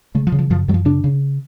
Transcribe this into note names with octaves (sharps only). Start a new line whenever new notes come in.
C#3 A3
F3
C#3
F3
F#2 F3
F#2 F#3
F3
C#3 D4
C#3